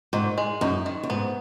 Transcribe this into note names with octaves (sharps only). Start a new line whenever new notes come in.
G#2 D#3
G#3
F#2 D#4
D#3
F#2
G#2 B3